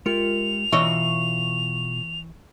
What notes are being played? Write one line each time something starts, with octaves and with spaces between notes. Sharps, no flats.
G#3 F4 G4 A#4 E5 C#7 F7
B2 E3 F4 C#5 D#5 C#6